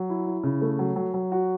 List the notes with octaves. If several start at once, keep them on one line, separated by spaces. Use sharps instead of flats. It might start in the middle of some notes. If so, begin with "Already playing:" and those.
Already playing: F#3
E4
E4
C#3
A3
F#3
F#3
F#3
F#4